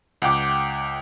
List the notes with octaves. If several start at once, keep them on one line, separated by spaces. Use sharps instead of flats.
C#2 F#5 G5 D6